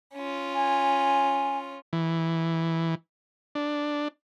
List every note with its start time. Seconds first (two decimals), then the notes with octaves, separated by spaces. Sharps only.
0.14 C#4 F4
0.54 G#5
1.93 E3
3.55 D4